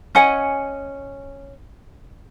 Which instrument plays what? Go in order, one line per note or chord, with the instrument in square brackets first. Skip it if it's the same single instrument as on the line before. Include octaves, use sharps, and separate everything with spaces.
[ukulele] C#4 D#5 F#5 G#5